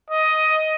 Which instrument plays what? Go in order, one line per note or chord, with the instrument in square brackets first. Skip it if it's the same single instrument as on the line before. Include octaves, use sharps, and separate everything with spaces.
[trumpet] D#5